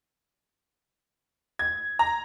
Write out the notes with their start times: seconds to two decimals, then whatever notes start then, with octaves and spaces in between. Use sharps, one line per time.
1.59 G#6
1.99 A#5